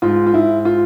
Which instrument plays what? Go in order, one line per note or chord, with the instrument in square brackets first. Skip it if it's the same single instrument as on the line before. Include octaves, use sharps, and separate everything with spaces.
[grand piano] G#2 F4
F4
G#2 E4
F4